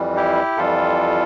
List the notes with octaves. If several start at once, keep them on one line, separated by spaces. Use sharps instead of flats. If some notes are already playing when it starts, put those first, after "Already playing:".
Already playing: F2 E3 G3
E4 G4
F2 E3 G3 F4 A4